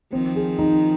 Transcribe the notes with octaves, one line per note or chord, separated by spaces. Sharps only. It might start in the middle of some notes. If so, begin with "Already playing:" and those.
D#3 F3 C4
G#4
D#4